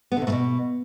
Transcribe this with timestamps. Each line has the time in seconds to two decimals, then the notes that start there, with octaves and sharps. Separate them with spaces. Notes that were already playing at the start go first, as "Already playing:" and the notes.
0.12 B3
0.17 D3
0.22 C3
0.27 A2
0.32 B2